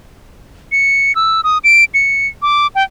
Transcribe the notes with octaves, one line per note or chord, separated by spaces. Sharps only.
C#7
E6
D#6
D7
C#7
D6
G5